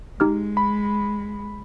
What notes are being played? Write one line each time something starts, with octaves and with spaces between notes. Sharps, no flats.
G#3 D#4 G4 F6
B5